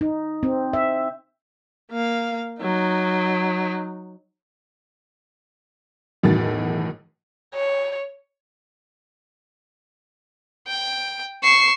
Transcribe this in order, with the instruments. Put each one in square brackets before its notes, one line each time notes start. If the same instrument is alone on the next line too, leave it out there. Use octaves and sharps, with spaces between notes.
[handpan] D#4
C4
E5
[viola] A#3 F5
F#3 D#4
[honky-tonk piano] B1 E2 A2 D#3 F#3 A6
[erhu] C#5
[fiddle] G5
[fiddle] C#6 [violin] C7 E7